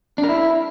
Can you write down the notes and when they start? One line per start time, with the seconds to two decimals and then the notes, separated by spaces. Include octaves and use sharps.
0.18 D4
0.23 A#4
0.29 E4